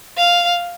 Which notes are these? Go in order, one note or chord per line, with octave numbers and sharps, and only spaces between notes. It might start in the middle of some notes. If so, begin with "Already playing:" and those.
F5